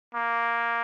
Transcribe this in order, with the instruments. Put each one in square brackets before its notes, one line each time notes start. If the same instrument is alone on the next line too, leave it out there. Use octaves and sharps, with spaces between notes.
[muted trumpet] A#3